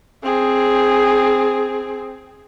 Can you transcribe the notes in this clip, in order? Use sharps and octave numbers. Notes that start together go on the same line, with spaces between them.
C4 G#4